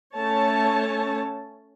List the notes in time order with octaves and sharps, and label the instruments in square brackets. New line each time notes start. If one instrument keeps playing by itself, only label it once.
[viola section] A3 C#4 C#5 A5